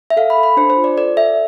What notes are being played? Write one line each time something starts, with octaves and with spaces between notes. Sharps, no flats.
E5
A4 F5
B5
A4
B5
D4 C5
C5
F4
D5
A4 D5
A4 E5